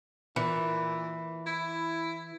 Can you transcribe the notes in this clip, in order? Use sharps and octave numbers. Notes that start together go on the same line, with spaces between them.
A#2 E3
E4